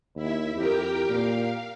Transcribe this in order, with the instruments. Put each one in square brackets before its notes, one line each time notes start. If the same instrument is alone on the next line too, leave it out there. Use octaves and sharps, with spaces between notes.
[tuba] D#2 [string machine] E4 E5
[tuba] F2 [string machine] G4 A#4 G5
[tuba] A#2 [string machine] F5